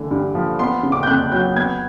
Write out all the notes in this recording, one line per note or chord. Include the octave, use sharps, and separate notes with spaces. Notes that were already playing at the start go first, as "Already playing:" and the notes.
Already playing: D3 E3 A3
G2
F3
B3 C6
C#3
D6
G6
F2 F#6
F#3 G6
B3 G#6